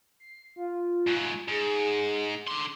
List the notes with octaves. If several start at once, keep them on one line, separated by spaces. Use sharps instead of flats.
C7
F4
G#2 F#3
G#2 G#4
D3 C6 D6